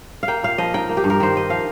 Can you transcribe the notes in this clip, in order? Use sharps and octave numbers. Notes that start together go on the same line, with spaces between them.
F5
A#3 G5
A#2 F5
F3 D#5
D#4 G5
A#3
G4
G2
A#4
D#3 C5
D#4 D#5
F3 F5